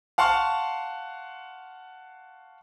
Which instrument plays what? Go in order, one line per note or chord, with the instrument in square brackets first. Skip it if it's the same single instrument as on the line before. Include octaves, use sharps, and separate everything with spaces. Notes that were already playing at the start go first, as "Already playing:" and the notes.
[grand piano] F5 F#5 A5 C6 C#6 F6